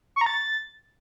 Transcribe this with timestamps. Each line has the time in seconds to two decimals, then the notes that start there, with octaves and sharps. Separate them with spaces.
0.16 C#6
0.21 A#5
0.26 A6